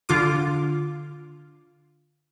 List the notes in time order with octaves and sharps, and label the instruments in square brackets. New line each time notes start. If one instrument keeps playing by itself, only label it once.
[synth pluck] D3 F4 D6